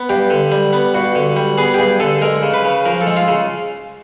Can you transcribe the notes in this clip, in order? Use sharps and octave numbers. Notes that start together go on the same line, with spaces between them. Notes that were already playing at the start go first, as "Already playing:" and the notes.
Already playing: B3
G2 G4
D3
G3
B3
G2 F#4
D3
G3
B3 G#4
G4
G2 G#4
D3 A4
G#3 A#4
C#3
B4
C#3
F3 A#4
A4
G#3
F4
C#3